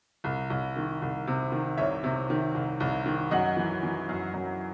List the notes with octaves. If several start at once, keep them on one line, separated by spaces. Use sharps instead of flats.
C2
C2
D#3
C2
C3
D#3
C2 C#5 E5
C3
D#3
C2
C2
D#3
F#2 D#5 F#5
E3
E3
F#2
F#2